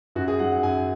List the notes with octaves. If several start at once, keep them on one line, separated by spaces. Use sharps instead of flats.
F#2 F#4
G#4
F#3 F#5
F#5
F#2 G#5